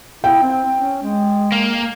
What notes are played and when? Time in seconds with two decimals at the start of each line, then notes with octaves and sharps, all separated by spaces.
0.24 E4 G5
0.42 C4
0.75 C#4
1.02 G#3
1.52 A#3